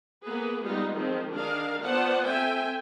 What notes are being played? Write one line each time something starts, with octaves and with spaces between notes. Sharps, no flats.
A#3 B3 G#4 B4
G3 G#3 B3 D#4 F4
D#3 F3 G#3 C4
D#3 D4 G#4 A#4 F5
B3 F4 C5 D5 F#5 A5
C4 A4 E5 G5 G#5